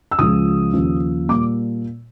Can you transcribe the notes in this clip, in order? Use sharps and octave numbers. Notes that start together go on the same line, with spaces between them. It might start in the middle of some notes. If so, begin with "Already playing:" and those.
E6
C#2 C#3 F3 G#3 D#6
D#2 C#3 F3
A#2 G3 A#3 D6